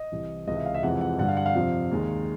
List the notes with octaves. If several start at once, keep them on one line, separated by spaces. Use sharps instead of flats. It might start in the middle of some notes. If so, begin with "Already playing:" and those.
Already playing: D#5
C2 C3 E3
C#2 C3 E3 G#3 D#5
E5
F5
E5
F2 C3 E3 G#3 F#5
F#5
G2 D3 G3 F#5
F5
F#5
F5
F2 C3 F3
D#2 D#3 G#3